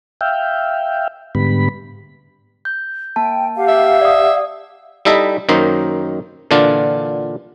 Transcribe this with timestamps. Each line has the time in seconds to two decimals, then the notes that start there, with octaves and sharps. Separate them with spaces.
0.21 E5 F5 G5
1.35 G#2 D3 G3 B3 B5
2.65 G6
3.16 A#3 G5 A5
3.55 G4 F5 F#5
3.68 E5
4.01 D5 D#6
5.05 G3 D#4 E4 A4 D#5 E5
5.49 F#2 D#3 A#3 D#4 C5
6.51 A#2 D3 E3 D4 F4